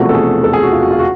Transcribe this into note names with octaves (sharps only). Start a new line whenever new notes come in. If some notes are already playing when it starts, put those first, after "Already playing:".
Already playing: E1 E2 C3 F3 A3 F#4
A4
G#4
A4
G#4
F#4
F4
F#4
F4
F#4